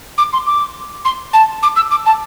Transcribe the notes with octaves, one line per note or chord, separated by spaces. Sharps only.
D6
C6
D6
C6
A5
D6
E6
D6
A5